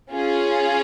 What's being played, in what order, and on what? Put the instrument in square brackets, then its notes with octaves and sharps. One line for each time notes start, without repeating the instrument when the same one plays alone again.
[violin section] C#4 F4 G#4